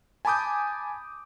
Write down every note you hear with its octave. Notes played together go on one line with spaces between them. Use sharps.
G#5 A5 B5 D6 D#6 G6